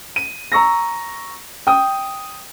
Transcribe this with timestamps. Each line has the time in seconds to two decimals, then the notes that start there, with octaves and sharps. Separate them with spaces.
0.16 D#7
0.52 A#5 C#6 E6 A#6
1.67 G5 D#6